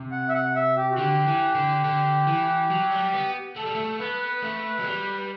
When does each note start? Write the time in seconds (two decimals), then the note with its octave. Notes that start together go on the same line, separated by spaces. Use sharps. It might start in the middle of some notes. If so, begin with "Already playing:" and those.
Already playing: C3
0.11 F#5
0.29 E5
0.34 F#5
0.55 E5
0.76 G4
0.92 F#4
0.98 D3 G4
1.27 E3
1.55 D3
1.84 D3
2.27 E3
2.70 F#3
2.91 G3
3.13 B3
3.56 A3 A4
3.66 G3
3.75 A3
3.99 B3 B4
4.42 A3
4.79 F#3
4.85 G3